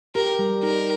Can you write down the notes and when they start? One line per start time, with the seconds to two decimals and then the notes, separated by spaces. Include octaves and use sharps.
0.15 G4 A#4
0.39 G3
0.63 D#4 A#4